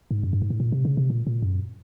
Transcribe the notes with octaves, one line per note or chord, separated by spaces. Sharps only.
G#2
F#2
G2
G#2
A2
A#2
C3
C#3
C3
A#2
A#2
F#2